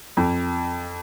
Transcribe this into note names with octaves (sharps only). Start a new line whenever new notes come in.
F2